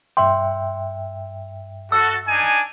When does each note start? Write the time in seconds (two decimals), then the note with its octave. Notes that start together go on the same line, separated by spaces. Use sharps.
0.17 G2 E5 G5 C6
1.92 F#4 A4 E6
2.28 D4 D#4 G#5